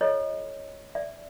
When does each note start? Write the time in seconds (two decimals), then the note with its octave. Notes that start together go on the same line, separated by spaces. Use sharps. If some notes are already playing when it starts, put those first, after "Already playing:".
0.01 F4 A4 C5 C#5 D#5
0.95 D5 E5